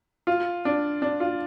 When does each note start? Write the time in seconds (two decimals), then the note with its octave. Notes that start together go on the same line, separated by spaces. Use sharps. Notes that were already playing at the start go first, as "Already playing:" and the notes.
0.27 F4
0.65 D4
1.02 D4
1.20 F4